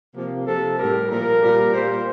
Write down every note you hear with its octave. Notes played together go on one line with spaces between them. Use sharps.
C3 F3 A#3
C3 F3 A4
A2 G3 A#4
A#2 F3 A#4
A#2 G3
A#2 G3 C5